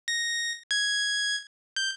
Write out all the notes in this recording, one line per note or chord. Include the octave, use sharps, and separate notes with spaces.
A#6
G#6
G6